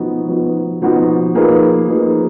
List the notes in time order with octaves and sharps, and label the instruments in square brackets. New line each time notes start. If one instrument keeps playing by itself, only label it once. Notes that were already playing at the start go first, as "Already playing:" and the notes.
Already playing: [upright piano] F3 B3 D#4 F#4
F3 B3 D#4 F#4
F3 B3 D#4 F#4
F3 A#3 D#4 G#4 B4
F3 A#3 D#4 G#4 B4